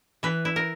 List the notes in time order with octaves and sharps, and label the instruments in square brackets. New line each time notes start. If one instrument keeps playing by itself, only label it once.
[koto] E3 B4
E4
A#4